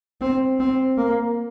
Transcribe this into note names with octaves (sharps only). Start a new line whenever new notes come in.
C4
C4
A#3